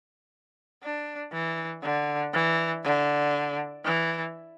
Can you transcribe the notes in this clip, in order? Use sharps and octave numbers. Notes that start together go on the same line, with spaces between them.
D4
E3
D3
E3
D3
E3